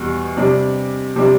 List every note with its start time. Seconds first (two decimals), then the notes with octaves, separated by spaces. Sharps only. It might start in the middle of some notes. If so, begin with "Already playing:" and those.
Already playing: E2 B2 G3
0.37 C3 G3 D4
1.16 C3 G3 D4